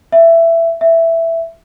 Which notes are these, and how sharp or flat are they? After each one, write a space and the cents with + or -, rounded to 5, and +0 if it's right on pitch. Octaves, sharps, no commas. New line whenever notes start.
E5 +15
E5 +5